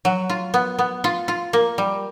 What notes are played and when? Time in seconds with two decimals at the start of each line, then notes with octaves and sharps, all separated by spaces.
0.05 F#3
0.30 F4
0.54 B3
0.79 B3
1.04 F4
1.28 F4
1.53 A#3
1.78 G3